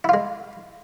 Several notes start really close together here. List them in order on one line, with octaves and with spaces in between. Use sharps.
E4 F4 G#3